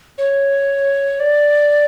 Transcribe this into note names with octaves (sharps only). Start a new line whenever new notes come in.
C#5
D5